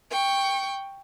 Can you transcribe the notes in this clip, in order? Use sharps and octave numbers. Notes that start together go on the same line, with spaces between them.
G5 C#6